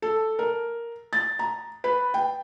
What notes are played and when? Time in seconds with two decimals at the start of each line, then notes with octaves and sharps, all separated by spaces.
0.02 A4
0.39 A#4
1.13 A6
1.39 A#5
1.84 B4
2.14 G5